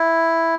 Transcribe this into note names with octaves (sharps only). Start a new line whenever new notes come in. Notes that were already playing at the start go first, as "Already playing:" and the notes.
Already playing: E4